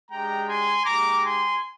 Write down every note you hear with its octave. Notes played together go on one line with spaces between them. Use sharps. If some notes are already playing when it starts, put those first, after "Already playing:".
G#3 D4 G4 G5 A#5
G#5 C6
G#3 D#4 G4 A#5 D6
G#5 C6